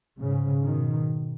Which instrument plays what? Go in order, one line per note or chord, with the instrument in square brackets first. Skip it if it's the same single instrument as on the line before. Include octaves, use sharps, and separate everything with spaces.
[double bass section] G#2 C#3
B2 D#3